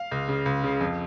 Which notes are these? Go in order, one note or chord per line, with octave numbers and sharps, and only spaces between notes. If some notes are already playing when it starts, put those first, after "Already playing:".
Already playing: F5
C#2
C#3
C#2
C#3
F2